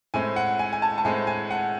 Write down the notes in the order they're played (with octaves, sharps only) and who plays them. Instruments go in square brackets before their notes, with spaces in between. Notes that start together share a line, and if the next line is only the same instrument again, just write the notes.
[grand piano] A2 G#3 C4 G#5
F#5
G#5
G#5
A5
A5
A2 G#3 C4 G#5
G#5
F#5